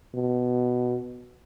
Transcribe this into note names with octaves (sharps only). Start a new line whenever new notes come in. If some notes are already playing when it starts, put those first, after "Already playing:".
B2